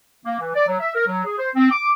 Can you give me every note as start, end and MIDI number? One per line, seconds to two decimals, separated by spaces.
0.24 0.38 58
0.39 0.52 52
0.55 0.64 74
0.67 0.77 54
0.79 0.91 76
0.95 1.05 70
1.07 1.23 54
1.24 1.37 68
1.38 1.49 72
1.56 1.68 60
1.70 1.90 86